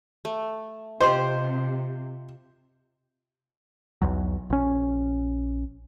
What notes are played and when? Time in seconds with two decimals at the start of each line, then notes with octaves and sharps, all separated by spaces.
0.25 A3
1.01 C3 F4 G4 C5 D#5 C6
4.02 B1 E2 F#3
4.50 A#1 C#4